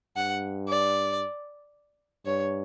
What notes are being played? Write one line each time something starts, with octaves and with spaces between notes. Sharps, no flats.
G2 F#5
D5
G2 C#5